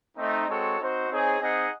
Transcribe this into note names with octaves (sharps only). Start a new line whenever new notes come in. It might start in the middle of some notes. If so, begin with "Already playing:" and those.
A3 C4 D#4
G#3 C4 F#4 A4 C#5
C4 D#4 F#4 C5
C4 D#4 G#4 C#5
C4 D#4 G#4 D#5 F#5